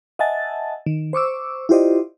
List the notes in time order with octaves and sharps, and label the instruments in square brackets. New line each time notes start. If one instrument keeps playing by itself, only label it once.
[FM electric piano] D#5 E5 F#5 G#5 A5 A6
D#3
C5 C#6 D6 E6
E4 F4 G4 C5 D5 D#5